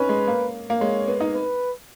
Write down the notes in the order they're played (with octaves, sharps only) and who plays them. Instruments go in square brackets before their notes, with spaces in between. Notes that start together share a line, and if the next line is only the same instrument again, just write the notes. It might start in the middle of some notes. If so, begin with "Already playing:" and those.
Already playing: [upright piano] B3 C#4 D#4 [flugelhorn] B4
[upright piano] G#3
A#3
A#3
[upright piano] G#3 [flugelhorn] C#5
[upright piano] B3
D#4
[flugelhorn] B4